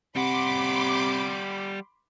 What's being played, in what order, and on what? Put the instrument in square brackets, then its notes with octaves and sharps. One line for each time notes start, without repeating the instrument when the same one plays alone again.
[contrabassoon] C3 [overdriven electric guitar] G3 F#5 [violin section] B5 C6 D6